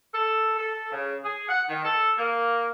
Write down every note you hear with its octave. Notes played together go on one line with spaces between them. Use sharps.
A4
A4
C#3
G#4
F#5
D#3
A4
A#3